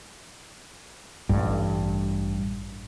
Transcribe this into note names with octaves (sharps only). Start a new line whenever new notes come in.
A1 G2